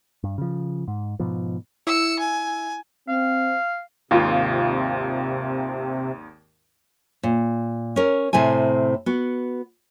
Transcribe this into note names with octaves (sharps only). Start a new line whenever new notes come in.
G2
C#3 F3
G#2
G#2 B2 F3
E4 E6 C#7
G#5
C4 F5
G#1 D#2 C3 F4
A#2
C#4 A#4
A2 C3 C4 G#5
B3 F#4